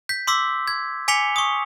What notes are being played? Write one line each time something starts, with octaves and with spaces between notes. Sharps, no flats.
G6 B6
C6 D6 E6 B6
G#6
G#5 D6 B6 C#7 F7 G7
C#6 D#6